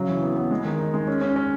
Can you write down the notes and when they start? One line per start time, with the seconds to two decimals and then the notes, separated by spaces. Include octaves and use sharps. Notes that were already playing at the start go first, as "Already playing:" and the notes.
Already playing: C#3 F#3
0.09 E3
0.23 B3
0.36 B3
0.51 G#3
0.65 D#3
0.79 D#4
0.94 G#3
1.07 C#4
1.21 C#4
1.36 C#4